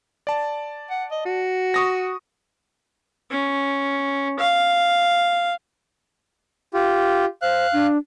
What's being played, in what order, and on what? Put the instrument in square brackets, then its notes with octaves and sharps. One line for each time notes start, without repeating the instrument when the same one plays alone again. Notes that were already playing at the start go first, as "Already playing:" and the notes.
[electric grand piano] D5 A5
[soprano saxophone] F#5
D#5
F#4
[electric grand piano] C#6 D#6 A#6
[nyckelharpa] C#4
F5
[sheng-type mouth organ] F4 G4
[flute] C5 [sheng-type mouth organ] F5 F#6
[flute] D4